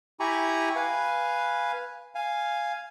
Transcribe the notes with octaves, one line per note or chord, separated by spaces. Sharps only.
E4 G4 G#5 A#5 B5 C#6
B4 F5 G#5
F5 G#5